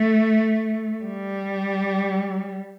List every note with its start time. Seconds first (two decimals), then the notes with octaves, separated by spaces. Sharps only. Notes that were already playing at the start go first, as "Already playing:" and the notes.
Already playing: A3
1.04 G3